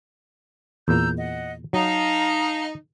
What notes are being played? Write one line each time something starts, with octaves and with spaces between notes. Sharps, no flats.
E2 A#2 A#5 E6 G6
D#5 F#5
F#3 D#4 F5 A5 A#5